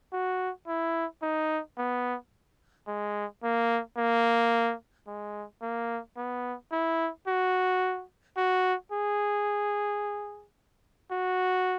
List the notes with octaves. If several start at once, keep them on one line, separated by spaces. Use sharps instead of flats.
F#4
E4
D#4
B3
G#3
A#3
A#3
G#3
A#3
B3
E4
F#4
F#4
G#4
F#4